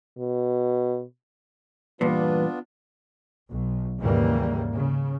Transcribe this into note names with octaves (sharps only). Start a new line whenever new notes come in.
B2
E2 G2 A#2 B3 D4 F4 B4
B1
D#2 G#2 C#3 E3 G3 A#3
C#3